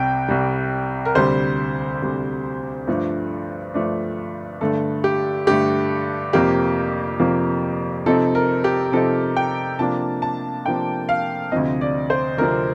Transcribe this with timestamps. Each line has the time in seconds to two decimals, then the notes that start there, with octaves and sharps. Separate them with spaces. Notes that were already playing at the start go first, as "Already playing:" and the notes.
Already playing: C2 C3 G3 G5
0.29 C2 C3 G3
1.05 A#4
1.15 D2 C3 G3 C5
2.02 D2 C3 G3
2.87 G2 F3 A3 D4
3.74 G2 F3 A3 D4
4.61 G2 D3 A3 A4
5.04 G4
5.47 G2 D3 A3 G4
6.33 F2 C3 F3 A#3 G4
7.19 F2 C3 F3 A#3
8.06 C3 F3 C4 D#4 A4
8.35 A#4
8.64 G4
8.92 C3 F3 C4 D#4 A4
9.36 G5
9.79 C3 F3 A#3 D4 A5
10.22 A5
10.66 C3 F3 A#3 D4 G5
11.09 F5
11.52 D2 C3 F3 C4 D#5
11.81 D5
12.10 C5
12.38 D2 C3 F3 C4 A#4